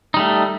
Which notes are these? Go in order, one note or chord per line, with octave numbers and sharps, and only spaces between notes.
G3 A3 D#4